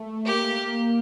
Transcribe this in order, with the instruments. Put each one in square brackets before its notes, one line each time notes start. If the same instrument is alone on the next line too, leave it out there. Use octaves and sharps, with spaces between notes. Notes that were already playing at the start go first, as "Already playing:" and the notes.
Already playing: [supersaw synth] A3
[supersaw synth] A#3 [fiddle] G4